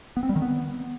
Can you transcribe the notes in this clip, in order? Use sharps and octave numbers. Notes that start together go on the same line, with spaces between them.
B3
C4
G3
D#3
B3